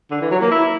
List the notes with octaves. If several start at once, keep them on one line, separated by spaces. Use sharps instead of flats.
D3
E3
F#3
A#3
E4